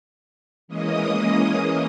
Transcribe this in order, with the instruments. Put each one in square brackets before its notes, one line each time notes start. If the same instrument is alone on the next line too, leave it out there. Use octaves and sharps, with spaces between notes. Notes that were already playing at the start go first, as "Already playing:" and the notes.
[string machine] E3 G#3 A#3 C#4 D#5 D#6